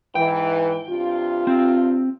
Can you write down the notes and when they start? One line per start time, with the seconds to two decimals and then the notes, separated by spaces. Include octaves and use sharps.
0.15 G#2 E3 G5
0.89 G2 C3 F4
1.47 C4